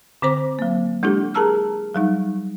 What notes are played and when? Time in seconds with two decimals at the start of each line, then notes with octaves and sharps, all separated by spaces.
0.22 D3 C4 C5 D6
0.59 F#3 A#3
1.03 G#3 D4 E4 G4 A4
1.34 G#4 A#4 A5 A#5 E6 F6
1.94 F#3 G3 D#4